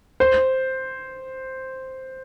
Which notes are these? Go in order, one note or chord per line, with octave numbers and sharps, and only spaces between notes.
C5